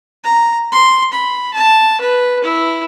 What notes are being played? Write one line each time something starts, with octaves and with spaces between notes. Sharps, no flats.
A#5
C6
B5
A5
B4
E4